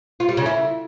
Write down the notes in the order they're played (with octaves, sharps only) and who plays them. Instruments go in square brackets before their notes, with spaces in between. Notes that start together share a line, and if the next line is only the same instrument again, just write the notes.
[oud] F4
G3
C#3
E4